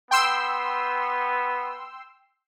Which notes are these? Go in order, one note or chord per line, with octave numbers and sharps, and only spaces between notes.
B3 G5 C6 E6